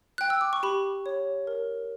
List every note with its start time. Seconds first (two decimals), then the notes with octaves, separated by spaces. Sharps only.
0.18 G5 F#6
0.30 E6
0.41 D6
0.53 C#6
0.63 G4 B5
1.06 C#5
1.47 A#4